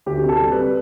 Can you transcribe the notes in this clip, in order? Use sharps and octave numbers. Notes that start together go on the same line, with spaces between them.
D2 G4
C3
A4
G3
B4